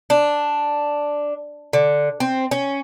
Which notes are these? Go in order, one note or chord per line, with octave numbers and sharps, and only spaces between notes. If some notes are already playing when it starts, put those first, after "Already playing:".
D4
D3
C4
C#4